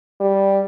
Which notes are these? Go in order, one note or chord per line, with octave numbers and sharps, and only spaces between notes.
G3